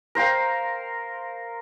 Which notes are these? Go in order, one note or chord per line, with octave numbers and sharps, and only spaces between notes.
A#4 C5 F5 G5